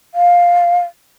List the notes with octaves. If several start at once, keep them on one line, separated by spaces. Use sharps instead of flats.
F5